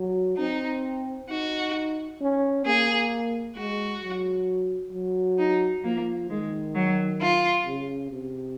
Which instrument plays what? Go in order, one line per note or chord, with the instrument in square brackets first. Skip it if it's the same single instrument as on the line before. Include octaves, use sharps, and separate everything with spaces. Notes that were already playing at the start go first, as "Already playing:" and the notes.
Already playing: [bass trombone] F#3
[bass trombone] C4 [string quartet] D#4
[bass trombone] D#4 [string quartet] F#4
[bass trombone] C#4
[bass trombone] A#3 [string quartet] G#4
[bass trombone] G#3 [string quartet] F#4
[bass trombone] F#3
F#3
[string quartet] D#4
[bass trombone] F3 [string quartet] A#3
[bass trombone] D#3 [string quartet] G#3
[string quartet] F#3
F4
[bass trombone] C#3
C3